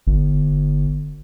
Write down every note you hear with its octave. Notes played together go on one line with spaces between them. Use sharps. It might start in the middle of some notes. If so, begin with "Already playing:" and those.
G1